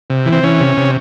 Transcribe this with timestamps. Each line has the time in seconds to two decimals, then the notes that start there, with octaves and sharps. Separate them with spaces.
0.10 C3
0.26 E3
0.32 C4
0.43 E3 C#4
0.60 C3
0.77 C3